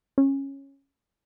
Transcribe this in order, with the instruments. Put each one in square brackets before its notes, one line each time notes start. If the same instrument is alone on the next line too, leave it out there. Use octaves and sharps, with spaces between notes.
[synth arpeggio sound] C#4